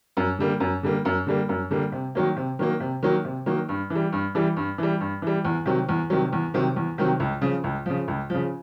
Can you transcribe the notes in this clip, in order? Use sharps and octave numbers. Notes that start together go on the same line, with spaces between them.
F#2
D3 G3 A#3
F#2
D3 G3 A#3
F#2
D3 G3 A#3
F#2
D3 G3 A#3
C3
D#3 F#3 A#3
C3
D#3 F#3 A#3
C3
D#3 F#3 A#3
C3
D#3 F#3 A#3
G2
E3 G3
G2
E3 G3
G2
E3 G3
G2
E3 G3
E2
C3 D#3 F#3
E2
C3 D#3 F#3
E2
C3 D#3 F#3
E2
C3 D#3 F#3
C#2
C#3 F3
C#2
C#3 F3
C#2
C#3 F3